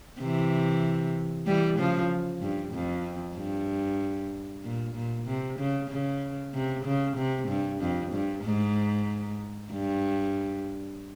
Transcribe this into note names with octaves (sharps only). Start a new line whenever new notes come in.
C3 E3
E3 G3
C#3 F3
G2
F2
G2
A#2
A#2
C3
C#3
C#3
C3
C#3
C3
G2
F2
G2
G#2
G2